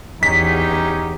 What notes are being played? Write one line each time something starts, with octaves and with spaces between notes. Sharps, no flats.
E2 C#4 D#4 G4 B6